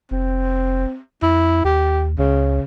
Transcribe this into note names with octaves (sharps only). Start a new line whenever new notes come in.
F1 C4
F2 E4
D#2 G4
C#2 C#3